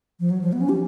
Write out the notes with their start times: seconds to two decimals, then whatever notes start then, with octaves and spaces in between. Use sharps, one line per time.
0.20 F3
0.30 F#3
0.41 F3
0.53 B3
0.61 C#4
0.69 G4